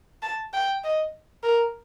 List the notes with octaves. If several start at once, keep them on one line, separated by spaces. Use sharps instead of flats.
A5
G5
D#5
A#4